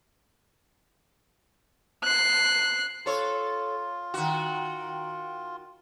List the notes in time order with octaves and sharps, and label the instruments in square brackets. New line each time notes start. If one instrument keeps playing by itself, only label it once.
[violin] F#6 C7
[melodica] F4 [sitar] A4 C#5
[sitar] D#3 F#4